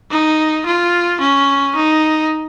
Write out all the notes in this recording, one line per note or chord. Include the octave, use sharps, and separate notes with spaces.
D#4
F4
C#4
D#4